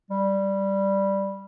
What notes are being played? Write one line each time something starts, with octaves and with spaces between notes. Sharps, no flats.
G3